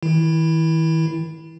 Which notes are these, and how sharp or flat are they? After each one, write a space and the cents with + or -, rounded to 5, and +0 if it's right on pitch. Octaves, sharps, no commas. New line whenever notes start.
D#3 +45 E4 +0